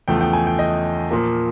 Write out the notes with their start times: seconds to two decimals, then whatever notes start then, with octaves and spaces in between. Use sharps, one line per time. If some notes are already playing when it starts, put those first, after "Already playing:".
0.08 E2 C#3 F3 A3 G5
0.21 G5
0.33 G#5
0.47 G5
0.59 D#5
1.11 A#2 F3 A#3